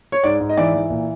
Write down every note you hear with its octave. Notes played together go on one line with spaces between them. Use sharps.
C#5
G#2 D5
G#2
D#5
E3 D5
E3
A#2